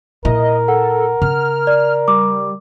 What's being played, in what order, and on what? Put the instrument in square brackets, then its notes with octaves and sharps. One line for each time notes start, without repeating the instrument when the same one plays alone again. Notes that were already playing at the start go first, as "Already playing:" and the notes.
[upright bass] A#2 E4 [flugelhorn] A#4 [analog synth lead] D#5
[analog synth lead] A4 [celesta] F#5
[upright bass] C#3 [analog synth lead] F6
[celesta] D5
[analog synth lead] G3 [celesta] D6